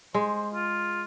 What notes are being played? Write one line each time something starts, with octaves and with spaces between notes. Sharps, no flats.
G#3 C5
F4